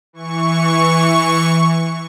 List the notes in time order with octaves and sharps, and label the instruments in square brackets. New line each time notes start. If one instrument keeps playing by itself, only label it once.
[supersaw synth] E3 C#6